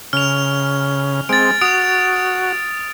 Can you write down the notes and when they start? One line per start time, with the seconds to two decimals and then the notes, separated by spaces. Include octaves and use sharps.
0.13 C#3 F6 F7
1.29 G#3 C4 A6 D7
1.61 F#4 D#6 D7 F7